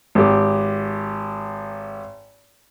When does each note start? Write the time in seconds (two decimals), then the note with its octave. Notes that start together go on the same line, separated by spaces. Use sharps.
0.15 G#1 G4